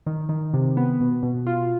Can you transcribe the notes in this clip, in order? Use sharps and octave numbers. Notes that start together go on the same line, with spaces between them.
D#3
D#3
C3
B3
B2
B2
F4